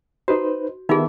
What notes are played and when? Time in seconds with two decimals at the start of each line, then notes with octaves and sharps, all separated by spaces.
0.28 D#4 F#4 B4 C5
0.89 D#3 B3 D#4 F4 G#4 E5